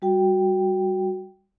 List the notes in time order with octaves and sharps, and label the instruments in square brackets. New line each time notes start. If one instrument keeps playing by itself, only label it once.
[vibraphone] G3 F#4 G5